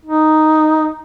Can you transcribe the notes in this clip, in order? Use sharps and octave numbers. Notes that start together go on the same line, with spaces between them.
D#4